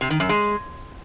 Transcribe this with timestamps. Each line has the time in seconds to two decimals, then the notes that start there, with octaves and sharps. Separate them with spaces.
0.01 C3
0.10 D#3
0.20 F#2
0.29 G#3